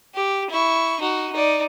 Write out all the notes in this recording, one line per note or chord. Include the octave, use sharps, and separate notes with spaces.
G4
E4 C#6
D#4 F#4
D#4 D5